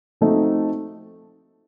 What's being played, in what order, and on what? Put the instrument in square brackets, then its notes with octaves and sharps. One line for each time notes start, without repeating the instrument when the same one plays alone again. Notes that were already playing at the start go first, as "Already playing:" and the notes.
[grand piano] F3 A3 C4 D#4 F#4